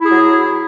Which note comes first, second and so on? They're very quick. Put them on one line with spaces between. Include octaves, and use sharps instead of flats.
E4 G#4 F#3